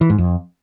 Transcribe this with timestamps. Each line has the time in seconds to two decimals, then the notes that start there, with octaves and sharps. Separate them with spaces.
0.01 E3
0.10 G#2
0.18 F2